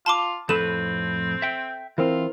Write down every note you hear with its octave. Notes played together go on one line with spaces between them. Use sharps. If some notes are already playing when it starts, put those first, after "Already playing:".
F4 A5 C6 D6
F2 A2 C4 A4 B4 E7
E5 G5
E3 C4 E4 F4 A#4 C5